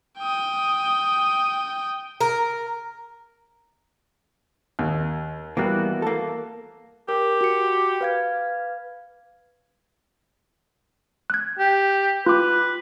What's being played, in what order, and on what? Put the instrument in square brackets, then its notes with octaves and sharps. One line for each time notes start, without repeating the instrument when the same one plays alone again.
[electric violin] G5 D#6
[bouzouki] A#4
[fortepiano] D#2
[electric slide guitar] E3 B3 F#4 [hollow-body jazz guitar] G3 A#3
[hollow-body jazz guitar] A#3 A4
[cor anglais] G4 [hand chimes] A#4
[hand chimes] F#4 C#7
B4 F5 G#6
[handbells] F#6 G#6
[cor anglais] G4
[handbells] F4 D6 [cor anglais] B4